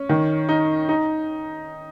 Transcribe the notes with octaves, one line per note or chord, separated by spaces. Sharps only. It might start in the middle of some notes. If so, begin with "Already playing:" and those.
Already playing: C#4
D#3
D#4
D#4